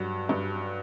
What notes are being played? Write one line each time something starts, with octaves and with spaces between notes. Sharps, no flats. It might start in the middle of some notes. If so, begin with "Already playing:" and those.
Already playing: G2 F#3 F#4
G2